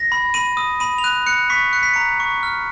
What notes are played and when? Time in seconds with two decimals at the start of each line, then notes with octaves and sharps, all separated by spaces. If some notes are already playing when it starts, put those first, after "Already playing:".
Already playing: A#6
0.12 B5
0.34 B5 D#7
0.57 D#6 D#7
0.80 B5 D#7
0.98 F7
1.04 F#6 D#7
1.27 F#6 C#7
1.50 C#6 B6
1.73 F#6 C#7
1.83 B6
1.94 A#5 C#7
2.20 C#6
2.43 F6